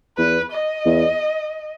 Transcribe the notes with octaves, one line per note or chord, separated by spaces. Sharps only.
E2 B4
D#5
E2